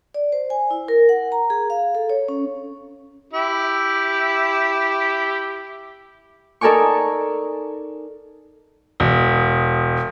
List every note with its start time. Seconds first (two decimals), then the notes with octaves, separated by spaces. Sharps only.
0.14 D5
0.32 C5
0.50 G#5
0.71 E4
0.88 A#4
1.09 F#5
1.32 A#5
1.50 G#4
1.70 F5
1.95 A4
2.10 C#5
2.28 C#4
3.33 E4 G4
6.61 D#4 A4 A#4 D5 G#5 C#6
9.00 E1